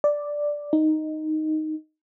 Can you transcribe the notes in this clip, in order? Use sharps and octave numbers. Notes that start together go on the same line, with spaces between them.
D5
D#4